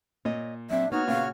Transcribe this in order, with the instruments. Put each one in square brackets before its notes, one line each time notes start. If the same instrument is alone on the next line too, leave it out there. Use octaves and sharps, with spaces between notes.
[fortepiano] A#2 [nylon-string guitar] C#5 D#5
[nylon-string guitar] F#3 C4 [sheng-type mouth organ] D4 [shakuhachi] E5
[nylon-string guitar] A#3 B3 [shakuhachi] D#4 [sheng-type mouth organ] F#4 C#5 F6
[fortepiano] A#2 C#3 [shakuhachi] F5